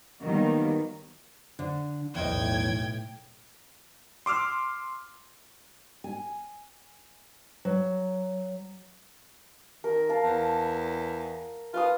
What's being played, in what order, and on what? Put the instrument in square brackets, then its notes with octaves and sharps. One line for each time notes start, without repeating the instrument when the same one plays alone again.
[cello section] D#3 F#3 G3 A#3 B3
[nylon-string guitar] D3
[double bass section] B1 A2 [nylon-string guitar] E2 D#5 [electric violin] G5 G#6
[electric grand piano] C6 D6 E6 F6
[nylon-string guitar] G#5
F#3
[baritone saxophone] D#3 [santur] A#4
[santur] A#4 F5 A5
[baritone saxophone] E2
[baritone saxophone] F4 [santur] B4 F5 D#6